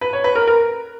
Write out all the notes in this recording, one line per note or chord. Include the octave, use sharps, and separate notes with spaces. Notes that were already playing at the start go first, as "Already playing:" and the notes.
B4
C#5
B4
A#4
A#4